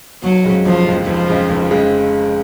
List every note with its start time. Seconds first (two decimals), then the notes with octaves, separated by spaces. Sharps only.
0.23 F1 F#3
0.44 F2 C#3 G#3
0.65 F1 F3
0.86 F2 C#3 G#3
1.07 F1 F3
1.29 F2 C#3 G#3
1.49 F1
1.71 F2 C#3 G#3